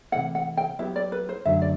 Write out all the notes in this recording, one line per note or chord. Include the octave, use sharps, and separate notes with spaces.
C3 E3 A3 E4 F#5
F#5
G5
F#3 B3 E4 G4 E5
D5
B4
C5
F#2 D3 F#3 A3 E5
D5